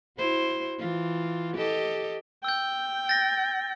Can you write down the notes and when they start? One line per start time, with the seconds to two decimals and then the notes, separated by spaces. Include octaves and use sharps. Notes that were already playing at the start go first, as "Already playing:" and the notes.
0.18 E4 F#4 C5
0.79 E3 F4
1.56 G4 A4 D#5
2.44 G5 E6 G6
3.09 A6 A#6